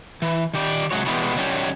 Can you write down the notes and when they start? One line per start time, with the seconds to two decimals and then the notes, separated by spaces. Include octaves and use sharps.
0.22 E3
0.54 D#3 G4 D5
0.91 C3 F#3 G#3 F#4 C#5
1.06 B2 E3 G3 G#3 A#3 B3
1.36 D#3 F#3 G3 A#3 C#4